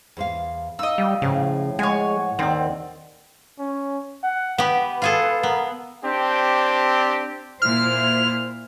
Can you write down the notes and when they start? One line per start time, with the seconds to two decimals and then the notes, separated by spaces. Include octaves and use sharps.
0.17 E2 C5 F5
0.79 D#4 D#5 F5 E6
0.98 G3
1.22 A2 C#3 F3
1.79 G#3 C#5 F#5 G#5
2.39 D#2 D#3 C4 D5
3.59 C#4
4.23 F#5
4.58 B3 G4 B4
5.02 F4 G#4 A4
5.43 B3 A#4
6.04 C4 D4 G4
7.62 A#2 E4 C5 F6